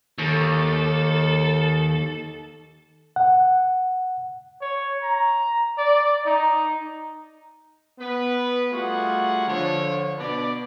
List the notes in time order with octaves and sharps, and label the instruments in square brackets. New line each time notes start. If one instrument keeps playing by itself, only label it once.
[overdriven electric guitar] D#2 [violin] A4
[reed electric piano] F#5
[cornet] C#5
A#5
D5
D#4
[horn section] B3 B4
G3 A3 F4 F#4 G#4 F#5
D3 F3 C#5
B2 D4 B4 D5